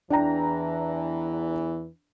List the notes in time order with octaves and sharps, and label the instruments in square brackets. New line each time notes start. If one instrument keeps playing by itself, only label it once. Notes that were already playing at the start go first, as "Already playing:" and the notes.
[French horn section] E2 E3 [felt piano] D4 G5 A#5